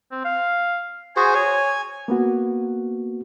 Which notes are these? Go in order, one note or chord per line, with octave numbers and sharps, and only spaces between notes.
C4
F5
F#4 G#4 C5 G#5
C#5 G#5
A#3 B3 F#4